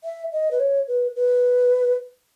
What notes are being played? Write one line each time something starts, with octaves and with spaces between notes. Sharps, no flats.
E5
D#5
B4
C#5
B4
B4